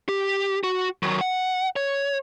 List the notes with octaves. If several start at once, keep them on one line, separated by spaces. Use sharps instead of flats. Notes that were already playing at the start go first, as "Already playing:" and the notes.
G4
F#4
D#3 F#3
F#5
C#5